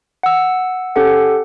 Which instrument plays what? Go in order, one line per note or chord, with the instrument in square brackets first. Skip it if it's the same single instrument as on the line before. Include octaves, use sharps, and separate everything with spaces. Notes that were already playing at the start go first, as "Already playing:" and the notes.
[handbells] F#5 E6
C#4 G4 A4 F#5